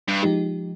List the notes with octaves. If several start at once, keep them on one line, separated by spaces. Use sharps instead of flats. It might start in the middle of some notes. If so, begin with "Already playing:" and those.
G2
F3 G#3 D#4 G4